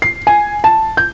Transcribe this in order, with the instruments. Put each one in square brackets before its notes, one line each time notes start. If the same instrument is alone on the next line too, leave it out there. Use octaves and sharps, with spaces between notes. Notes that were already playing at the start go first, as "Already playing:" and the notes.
[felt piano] C7
G#5
A5
G6